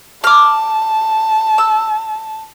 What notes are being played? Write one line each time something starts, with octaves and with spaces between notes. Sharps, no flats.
A5 D6 F6
E6